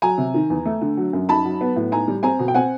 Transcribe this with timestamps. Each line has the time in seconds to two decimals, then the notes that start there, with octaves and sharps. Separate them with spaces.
0.02 F#3 G#5 A#5
0.18 C3
0.34 D#3
0.50 E2
0.66 A3
0.81 D3
0.97 F#3
1.13 F#2
1.29 D#4 A5 B5
1.45 F#3
1.61 B3
1.76 A2
1.92 D#4 G#5 A#5
2.08 G3
2.23 C4 G#5 A#5
2.39 B2
2.48 G5
2.54 C4 F#5 G#5